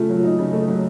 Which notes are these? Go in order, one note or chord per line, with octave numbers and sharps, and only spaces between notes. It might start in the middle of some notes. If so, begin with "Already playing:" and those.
Already playing: C#3 A3 F4
F#3
D#4
C#3
A3
F#3